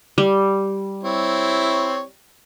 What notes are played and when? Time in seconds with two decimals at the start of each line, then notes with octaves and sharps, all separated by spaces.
0.18 G3
1.03 C4 E4 C#5